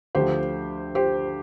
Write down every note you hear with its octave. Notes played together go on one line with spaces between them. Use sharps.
D2 D3 F3 G4 C5
G4 C5